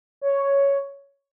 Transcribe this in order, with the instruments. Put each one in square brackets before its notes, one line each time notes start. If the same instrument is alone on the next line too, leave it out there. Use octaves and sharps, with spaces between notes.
[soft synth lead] C#5
C#5
C#5